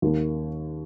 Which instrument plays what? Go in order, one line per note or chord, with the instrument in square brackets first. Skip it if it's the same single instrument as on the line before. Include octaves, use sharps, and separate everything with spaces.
[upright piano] D#2 D#3 A#3